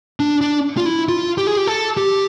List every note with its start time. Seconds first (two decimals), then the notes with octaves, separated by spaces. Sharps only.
0.20 D4
0.41 D4
0.77 F4
0.86 E4
1.09 F4
1.38 G4
1.47 G#4
1.57 G4
1.67 A4
1.97 G4